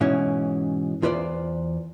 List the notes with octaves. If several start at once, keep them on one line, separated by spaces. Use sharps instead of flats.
G#2 B2 E3 C#4
E2 F4 B4 C5 D5